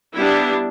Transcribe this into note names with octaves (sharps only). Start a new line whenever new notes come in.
G3 B3 D4 E4